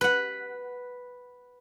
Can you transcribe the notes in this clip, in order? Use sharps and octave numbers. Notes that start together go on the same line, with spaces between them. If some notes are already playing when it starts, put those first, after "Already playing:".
B4 F#5